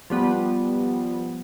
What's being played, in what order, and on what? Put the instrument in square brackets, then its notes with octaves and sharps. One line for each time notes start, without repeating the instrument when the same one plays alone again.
[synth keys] F3 G3 B3